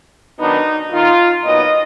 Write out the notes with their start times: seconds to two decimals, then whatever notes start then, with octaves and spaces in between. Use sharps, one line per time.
0.39 D#3 F#3 B3 D4 D#4
0.91 D#3 A#3 D#4 F4
1.44 A#2 F#3 B3 D#4 D#5